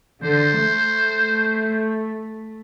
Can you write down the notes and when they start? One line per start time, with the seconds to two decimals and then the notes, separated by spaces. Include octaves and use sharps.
0.23 D3 C5
0.64 A3